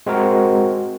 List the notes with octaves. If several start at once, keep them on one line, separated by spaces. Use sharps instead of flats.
G#3 C4 F#4 A#4